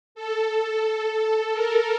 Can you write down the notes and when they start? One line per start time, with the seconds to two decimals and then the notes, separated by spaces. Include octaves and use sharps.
0.15 A4
1.53 A#4